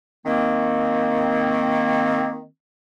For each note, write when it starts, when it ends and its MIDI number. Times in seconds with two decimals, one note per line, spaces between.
0.26 2.45 51
0.26 2.45 58
0.26 2.45 60